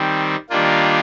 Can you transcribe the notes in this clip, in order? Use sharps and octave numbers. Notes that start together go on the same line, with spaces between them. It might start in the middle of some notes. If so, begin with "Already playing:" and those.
Already playing: D#3 G3 C4
D#3 G3 A#3 D4 F4